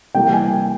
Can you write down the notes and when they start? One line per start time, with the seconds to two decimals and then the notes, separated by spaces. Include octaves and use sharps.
0.15 C2 C3 E3 G3 A#3 G5
0.33 G#5